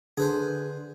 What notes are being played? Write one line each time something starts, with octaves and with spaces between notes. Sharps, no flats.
D3 G#4 B4 C5